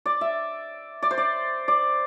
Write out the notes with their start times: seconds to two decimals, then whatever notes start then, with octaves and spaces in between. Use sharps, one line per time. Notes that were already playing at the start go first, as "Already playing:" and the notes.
0.06 D5
0.21 E5
1.02 D5
1.11 C5
1.18 D5
1.68 D5